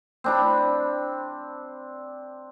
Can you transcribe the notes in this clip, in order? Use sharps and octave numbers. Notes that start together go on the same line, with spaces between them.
C4 D4 B5